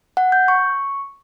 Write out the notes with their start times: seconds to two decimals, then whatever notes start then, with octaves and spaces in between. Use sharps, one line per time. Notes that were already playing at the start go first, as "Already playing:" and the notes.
0.17 F#5
0.32 G6
0.48 C#6